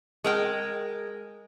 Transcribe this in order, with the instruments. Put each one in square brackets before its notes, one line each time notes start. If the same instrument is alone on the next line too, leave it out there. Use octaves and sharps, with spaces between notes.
[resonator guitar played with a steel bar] G#3 A#4 G5